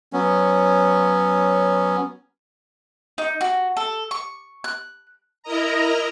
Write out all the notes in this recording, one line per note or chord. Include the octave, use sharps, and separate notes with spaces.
F#3 B3 C#4
D#4
F#4
A4
C#6
F#6
E4 A#4 D#5 A#5